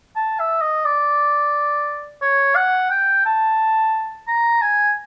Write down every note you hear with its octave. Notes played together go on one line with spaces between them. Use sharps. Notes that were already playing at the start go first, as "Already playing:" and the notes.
A5
E5
D#5
D5
C#5
F#5
G5
A5
A#5
G#5